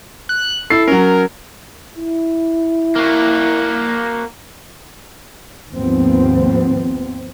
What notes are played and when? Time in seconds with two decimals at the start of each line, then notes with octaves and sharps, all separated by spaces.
0.29 F#6
0.70 E4 A4 C7
0.88 F#3 C#4 A#4
1.97 E4
2.96 A#3 F#4
5.71 D#2 G#2 F3 B3 C4